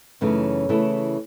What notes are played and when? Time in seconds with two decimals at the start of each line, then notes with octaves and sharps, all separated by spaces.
0.21 F#2 C#3 E3 A3 D#4
0.69 C#3 E3 A3 E4 A4